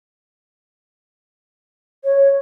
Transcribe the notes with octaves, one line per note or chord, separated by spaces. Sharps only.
C#5